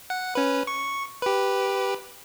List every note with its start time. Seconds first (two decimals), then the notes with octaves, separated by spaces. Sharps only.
0.10 F#5
0.35 C#4 B4
0.67 C#6
1.22 G4 B4